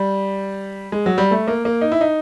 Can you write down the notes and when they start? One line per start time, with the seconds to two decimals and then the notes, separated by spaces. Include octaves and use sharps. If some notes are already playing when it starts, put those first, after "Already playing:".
Already playing: G3
0.92 G#3
1.06 F#3
1.18 G3
1.31 A3
1.48 A#3
1.65 A#3
1.81 D#4
1.92 E4
2.01 D#4